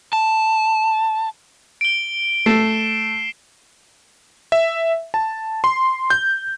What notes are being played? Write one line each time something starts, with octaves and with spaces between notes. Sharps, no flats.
A5
D7 G7
A3 C7 E7
E5
A5
C6
G6